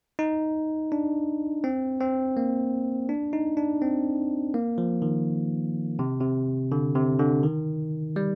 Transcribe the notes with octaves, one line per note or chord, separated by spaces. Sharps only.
D#4
D4
C4
C4
A#3
D4
D#4
D4
C4
A#3
F3
D#3
C3
C3
D3
C3
D3
D#3
G3